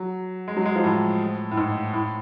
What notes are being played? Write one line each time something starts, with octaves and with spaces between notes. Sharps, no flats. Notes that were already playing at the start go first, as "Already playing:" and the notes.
Already playing: F#3
G#3
F#3
G#3
F3
A2
A2
G#2
A2